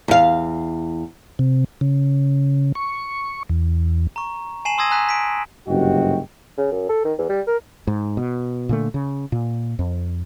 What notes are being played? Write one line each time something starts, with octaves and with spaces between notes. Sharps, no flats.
E2 F5
C3
C#3
C#6
E2
A#5 C#6
G#5 A5 C7 D#7 E7 F#7
C6 D#6 E6 G#6 A#6 D#7
G#5 A#5 F#6 B6 D#7
B6 D7
F#1 G2 C3 F#4 D#5 G5
C#3
F#2
A4
D#3
E2
G3
A#4
G#2
B2
A#2 D3 A3
C#3
A#2
F2